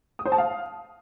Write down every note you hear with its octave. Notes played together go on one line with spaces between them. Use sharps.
D#6
C5
A5
F5